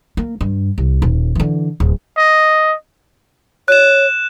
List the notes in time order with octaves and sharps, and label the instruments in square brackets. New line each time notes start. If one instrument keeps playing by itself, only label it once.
[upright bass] A#3
G2
C2
D#1
D3 E3
D1
[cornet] D#5
[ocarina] C#5 [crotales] F#6 E7